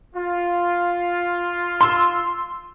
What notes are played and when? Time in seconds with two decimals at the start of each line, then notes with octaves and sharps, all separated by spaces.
0.16 F4
1.81 C6 E6